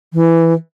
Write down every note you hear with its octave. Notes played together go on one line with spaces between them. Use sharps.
E3